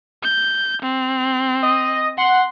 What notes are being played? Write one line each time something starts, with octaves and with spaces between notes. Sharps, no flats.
G6
C4
D#5
F#5 C6